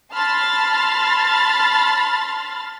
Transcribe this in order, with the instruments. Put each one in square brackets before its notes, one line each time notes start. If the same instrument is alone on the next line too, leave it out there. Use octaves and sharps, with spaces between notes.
[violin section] A5 B5 C6 F6 A6